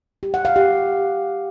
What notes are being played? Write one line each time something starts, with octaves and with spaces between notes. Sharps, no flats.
G4
F#5
F5
G4